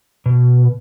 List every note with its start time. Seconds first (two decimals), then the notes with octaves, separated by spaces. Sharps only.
0.26 B2